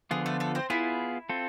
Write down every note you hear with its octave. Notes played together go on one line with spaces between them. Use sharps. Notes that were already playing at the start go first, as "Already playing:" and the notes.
D3 F3 B3 F4 G#4
A3 A4
A3 A4
C4 C5
B3 E4 F4 G#4
C4 F4 A4